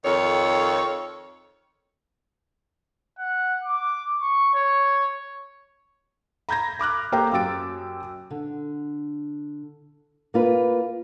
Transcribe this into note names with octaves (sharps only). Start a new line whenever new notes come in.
F2 D#3 A4 C#5
F#5
D6
C#6
C#5
A#5 B5 G6 G#6 A#6
B5 D6 F6 F#6
A#3 G4 A4 C5 G5 A#5
F#2 F#3 G4 E6 A6 D7
D3
A#3 F4 B4